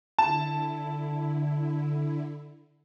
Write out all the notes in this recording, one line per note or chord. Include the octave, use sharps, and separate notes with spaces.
D3 E4 A5